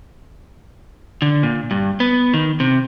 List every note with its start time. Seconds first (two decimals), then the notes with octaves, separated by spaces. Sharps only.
1.22 D3
1.43 A#2
1.71 G2
2.00 B3
2.34 D#3
2.60 C3